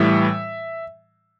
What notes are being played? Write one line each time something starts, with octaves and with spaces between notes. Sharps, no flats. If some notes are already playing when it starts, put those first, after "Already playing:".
Already playing: A2 E3 G3 E5